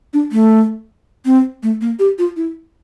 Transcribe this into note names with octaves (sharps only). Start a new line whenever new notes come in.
D4
A3
C4
A3
A#3
G4
F4
E4